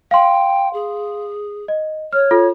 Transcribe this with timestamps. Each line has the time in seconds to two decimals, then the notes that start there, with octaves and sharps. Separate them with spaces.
0.11 F5 G5 C6
0.73 G#4
1.68 D#5
2.13 C#5 F6
2.31 F4 A4